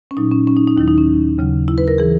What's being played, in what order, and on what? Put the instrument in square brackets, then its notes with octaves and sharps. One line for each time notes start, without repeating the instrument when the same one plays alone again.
[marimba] C#4
A#2 F#3 D#4
C#4
C#4
D#4
D#4
D#2 D#3 F#3 E4
D#4
C#4
D#2 C#3 F#3
E4
B4
A#4
E3 G#4